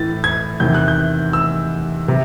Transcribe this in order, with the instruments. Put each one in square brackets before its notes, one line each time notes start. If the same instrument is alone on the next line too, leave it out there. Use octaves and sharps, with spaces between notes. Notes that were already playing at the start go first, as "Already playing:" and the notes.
Already playing: [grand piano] A2 E3 A6
G#6
E2 C3 D#3 G6
F#6
G6
E6
C3